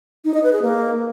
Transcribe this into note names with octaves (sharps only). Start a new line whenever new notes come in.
D#4
D#5
B4
G#4
A#3